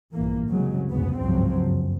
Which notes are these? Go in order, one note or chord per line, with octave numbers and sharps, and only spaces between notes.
A#1 G2 E3 A#3
F#1 C2 C#3 F#3 G#3
F1 D2 G#2 C#3 B3
G#1 C#2 G2 F3 F#3 C4
F#1